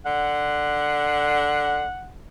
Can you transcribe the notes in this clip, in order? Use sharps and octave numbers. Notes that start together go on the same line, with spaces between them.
D3 F#5